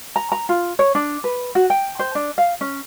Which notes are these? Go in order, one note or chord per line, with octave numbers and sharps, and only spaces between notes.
A#5
A#5
F4
C#5
D4
B4
F#4
G5
C5
D4
F5
C#4